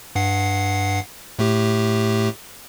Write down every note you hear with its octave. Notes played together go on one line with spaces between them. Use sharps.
G2 F#5 C7
A2 A3 G4